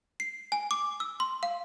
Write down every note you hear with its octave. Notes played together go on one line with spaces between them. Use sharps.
C7
G#5
D6
E6
C6
F5